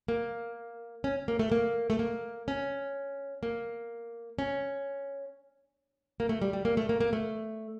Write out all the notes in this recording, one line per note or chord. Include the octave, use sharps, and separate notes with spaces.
A#3
C#4
A#3
A3
A#3
A3
A#3
C#4
A#3
C#4
A#3
A3
G3
G3
A#3
A3
A#3
A#3
A3